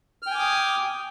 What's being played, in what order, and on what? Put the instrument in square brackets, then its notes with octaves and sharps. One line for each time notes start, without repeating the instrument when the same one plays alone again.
[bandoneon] F6
G5
G#5
D6
D#6